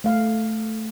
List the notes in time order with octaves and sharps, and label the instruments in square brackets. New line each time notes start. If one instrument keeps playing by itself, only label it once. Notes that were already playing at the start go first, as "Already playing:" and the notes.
[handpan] A3 F5